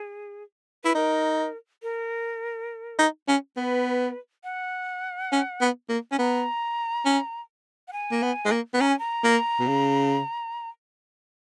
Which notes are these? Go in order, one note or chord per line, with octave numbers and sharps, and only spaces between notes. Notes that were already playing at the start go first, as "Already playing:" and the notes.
Already playing: G#4
E4 B4
D#4 A#4
A#4
D#4
C#4
B3 B4
F#5
C#4
B3
A#3
C#4
B3 A#5
C#4
F#5
G#5
A#3
B3
G#3
A#3
B3
C#4 A#5
G#5
A#5
A#3
B2
C#3